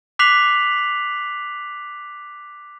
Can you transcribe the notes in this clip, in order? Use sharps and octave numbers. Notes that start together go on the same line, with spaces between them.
D6 F#6 B6 C7 F7 F#7